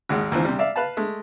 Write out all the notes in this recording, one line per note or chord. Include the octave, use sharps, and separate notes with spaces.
G#1 D#2 G#3 F#5
D#2 E3 F3 C4
C3 G3
D5 E5 F5
B4 F5 A5
G#3 A3